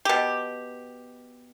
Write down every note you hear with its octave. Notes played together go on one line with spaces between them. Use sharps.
B2 G4